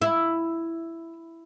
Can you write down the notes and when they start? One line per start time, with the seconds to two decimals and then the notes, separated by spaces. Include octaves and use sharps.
0.02 E4